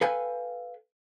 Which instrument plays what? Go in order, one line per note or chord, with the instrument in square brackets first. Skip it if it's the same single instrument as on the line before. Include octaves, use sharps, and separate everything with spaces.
[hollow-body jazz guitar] A4 B4 F5 G5 G#5